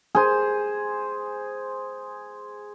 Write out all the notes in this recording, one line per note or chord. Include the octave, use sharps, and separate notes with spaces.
G#4 C5